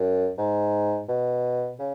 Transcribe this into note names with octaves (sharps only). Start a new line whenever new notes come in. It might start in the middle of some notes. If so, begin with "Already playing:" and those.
Already playing: F#2
G#2
B2
C#3